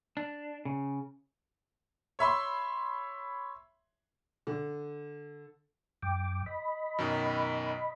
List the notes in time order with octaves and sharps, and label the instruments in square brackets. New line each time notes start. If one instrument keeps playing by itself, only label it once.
[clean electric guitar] D4
C#3
[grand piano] C#5 E5 B5 C6
[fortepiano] D3
[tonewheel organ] F#2 G5 D6
D#5 B5
[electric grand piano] F#2 B2 D#3